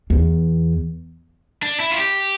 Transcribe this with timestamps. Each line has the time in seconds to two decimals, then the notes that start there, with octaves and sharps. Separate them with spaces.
0.10 E2
1.63 D4
1.80 E4
1.91 F4
1.98 G4